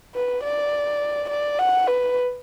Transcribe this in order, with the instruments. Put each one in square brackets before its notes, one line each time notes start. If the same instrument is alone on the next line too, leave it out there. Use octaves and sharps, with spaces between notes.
[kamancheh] B4
D5
D5
F#5
B4